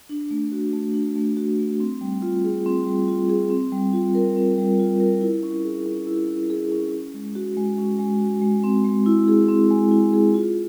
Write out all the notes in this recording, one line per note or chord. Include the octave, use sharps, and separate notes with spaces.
D4
A3
F#4
A3
D4
A3
F#4
A3
C4
G3
F4
G#4
C4
G3
F4
G#4
C4
G3
F4
A#4
C4
G3
F4
A#4
E4
C#4
G#4
C#4
E4
C#4
G#4
C#4
C#4
G#3
F#4
G#3
C#4
G#3
F#4
G#3
C4
G#3
E4
G#4
C4
G#3
E4
G#4
F4